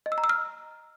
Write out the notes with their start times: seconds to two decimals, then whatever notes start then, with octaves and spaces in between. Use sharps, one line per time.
0.06 D#5
0.12 E6
0.18 A#5
0.24 E6
0.29 F6